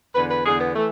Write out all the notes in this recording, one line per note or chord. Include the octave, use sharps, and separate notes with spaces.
E2 D3 B4
B4
E2 D3 G#4
B3
E3 A3